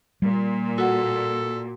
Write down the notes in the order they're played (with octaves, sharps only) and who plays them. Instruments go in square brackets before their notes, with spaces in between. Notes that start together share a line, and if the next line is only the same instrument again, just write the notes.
[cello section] A#2 [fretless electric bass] G3
[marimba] F#4 F#5 [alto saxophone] A4